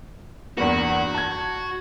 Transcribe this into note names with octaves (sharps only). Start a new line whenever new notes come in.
E2 G2 A#3 F#4
A5 G#6